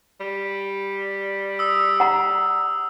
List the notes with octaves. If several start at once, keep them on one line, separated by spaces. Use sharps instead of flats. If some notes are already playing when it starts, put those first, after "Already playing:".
G3
D#6 E6
F#5 A#5